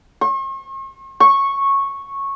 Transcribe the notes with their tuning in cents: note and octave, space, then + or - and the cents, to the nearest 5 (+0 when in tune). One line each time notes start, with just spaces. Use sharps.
C#6 -45
C#6 -10